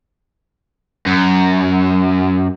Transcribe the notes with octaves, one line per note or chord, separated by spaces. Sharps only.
F#2